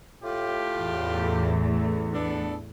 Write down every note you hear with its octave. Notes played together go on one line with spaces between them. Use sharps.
A2 F4 G4
A1 E2 A3
B3 D4 A4